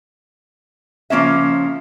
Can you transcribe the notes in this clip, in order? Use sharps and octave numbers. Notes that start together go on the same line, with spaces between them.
C#3 F3 A#3 C#4 E5